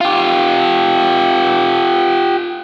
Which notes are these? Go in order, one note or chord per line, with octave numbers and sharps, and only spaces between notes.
F4 G4